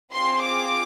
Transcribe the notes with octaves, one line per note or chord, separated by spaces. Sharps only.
C4 F4 G#4 C6
D6